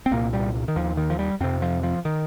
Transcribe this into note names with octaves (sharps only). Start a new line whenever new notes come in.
C4
C2 A#2 A#3
G3
D#3
D#2 F3
D#3
F3
G3
F2 C3 C4
F3
F3
D#3